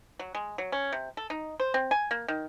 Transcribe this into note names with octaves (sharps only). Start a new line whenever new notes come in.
F#3
G#3
F#3
C#4
C3
A4
D#4
C5
C4
G#5
A#3
D#3